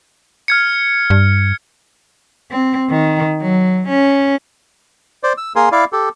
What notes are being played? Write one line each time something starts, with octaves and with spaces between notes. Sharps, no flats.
F6 G#6 C#7
G2
C4
D#3
F#3
C#4
C5 D5
E6
A#3 G#4 A#4 G#5 C6
E4 D5 F5
G4 A4